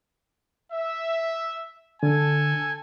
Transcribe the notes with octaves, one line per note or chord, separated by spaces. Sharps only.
E5
D3 A4 G#5